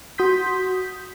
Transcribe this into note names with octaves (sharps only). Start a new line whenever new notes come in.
F#4 C6 D#6 G6 B6